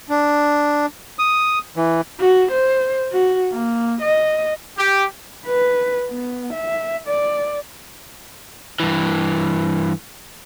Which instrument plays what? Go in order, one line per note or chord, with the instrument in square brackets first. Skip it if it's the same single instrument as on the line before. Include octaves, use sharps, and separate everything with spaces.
[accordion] D4
[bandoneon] D#6
E3
[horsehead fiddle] F#4
C5
F#4
A#3
D#5
[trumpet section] G4
[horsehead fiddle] B4
B3
E5
D5
[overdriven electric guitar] G2 E3